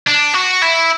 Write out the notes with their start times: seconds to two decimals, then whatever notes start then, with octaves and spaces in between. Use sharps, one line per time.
0.08 D4
0.34 F#4
0.62 E4